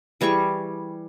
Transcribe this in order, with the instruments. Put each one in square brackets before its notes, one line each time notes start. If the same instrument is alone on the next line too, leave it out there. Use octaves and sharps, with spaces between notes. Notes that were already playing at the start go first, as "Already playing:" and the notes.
[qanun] E3 G3 G#4 C#6